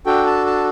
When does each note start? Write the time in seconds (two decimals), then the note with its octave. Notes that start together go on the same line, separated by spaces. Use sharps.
0.06 D4 F#4 A4 G5
0.26 A5
0.46 A5